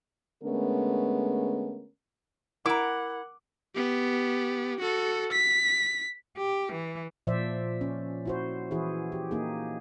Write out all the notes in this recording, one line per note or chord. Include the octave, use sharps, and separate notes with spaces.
D3 G#3 A3 B3 C#4 A#4
E4 A#4 F#5 A#5 D6
B3 G4
F#4 A4
B6
G4
E3
A#2 F3 C5 D5 E5
C#4
E4 F#4 C5
E3 E4 F#4 G#4
G4
A#3 D#4 G#4